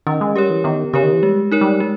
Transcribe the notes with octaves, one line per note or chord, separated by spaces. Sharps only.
D#3 C#4
G#3
G3 G4 A#4 C#5
E3
D#3 B3
C#3 G4 A#4 C#5
D#3
E3
G3 G#3
D#4 A#4 C#5
G3
G#3